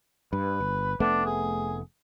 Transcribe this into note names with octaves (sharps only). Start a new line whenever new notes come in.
G2 B4
G1
F1 A3 B3 D4
G#4